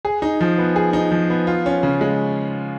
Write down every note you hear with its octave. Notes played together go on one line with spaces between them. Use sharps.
G#4
D#4
F3
B3
G#4
D#4
F3
B3
F4
C#4
C#3
G#3